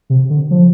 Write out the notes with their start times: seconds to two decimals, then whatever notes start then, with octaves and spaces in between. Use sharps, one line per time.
0.10 C3
0.30 D3
0.51 F3